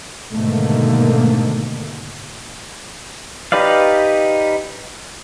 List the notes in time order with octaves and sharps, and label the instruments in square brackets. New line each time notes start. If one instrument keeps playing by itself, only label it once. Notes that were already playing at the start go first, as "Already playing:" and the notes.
[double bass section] G#2 B2 D3 D#3 A3 A#3
[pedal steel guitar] D#4 G4 B4 D5 F5